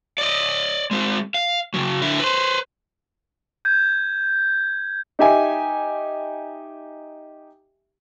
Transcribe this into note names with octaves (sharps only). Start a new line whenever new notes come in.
D5 D#5
G#3 C4
F5
C#3 F#3
D3 E4
B4 C5
G6 G#6
D#4 G4 E5 G#5